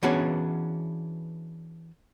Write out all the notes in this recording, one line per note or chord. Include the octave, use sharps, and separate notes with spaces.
E3 B3 C#4 D4 F#4 G#4